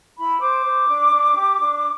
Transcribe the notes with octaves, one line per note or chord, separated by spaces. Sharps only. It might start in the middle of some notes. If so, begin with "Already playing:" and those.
E4 B5
C5 D6
C5
D4
D4
G4
D4